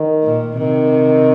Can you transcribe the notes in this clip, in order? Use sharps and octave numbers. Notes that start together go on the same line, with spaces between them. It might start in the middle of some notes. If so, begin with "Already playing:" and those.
Already playing: D#3
A#2
C3 D#3